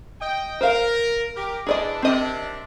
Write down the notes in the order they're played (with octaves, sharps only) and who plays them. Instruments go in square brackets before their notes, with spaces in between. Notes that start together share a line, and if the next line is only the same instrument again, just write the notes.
[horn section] D#5 G5
[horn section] A#4 [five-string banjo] C5 F5
[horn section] G4 A#4
[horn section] E3 G#3 D4 [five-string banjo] G#4 D5 D#5
[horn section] C3 D#3 D4 [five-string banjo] C4 D#5